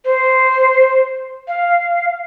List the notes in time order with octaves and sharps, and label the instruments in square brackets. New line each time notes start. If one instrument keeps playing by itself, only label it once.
[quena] C5
F5